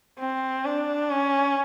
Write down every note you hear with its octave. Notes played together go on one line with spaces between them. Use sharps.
C4
D4
C#4